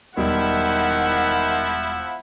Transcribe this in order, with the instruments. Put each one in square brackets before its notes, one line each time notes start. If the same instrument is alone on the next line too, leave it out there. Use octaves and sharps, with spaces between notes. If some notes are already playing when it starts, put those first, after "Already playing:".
[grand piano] E1 G3 [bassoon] D#3 [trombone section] F3 E4 [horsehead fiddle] F#5